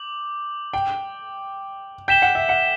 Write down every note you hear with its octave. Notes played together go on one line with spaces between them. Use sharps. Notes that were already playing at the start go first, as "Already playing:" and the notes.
Already playing: D6 G6 F#7
G5
G5 G6 B6 E7 G7
F#5
E5
F#5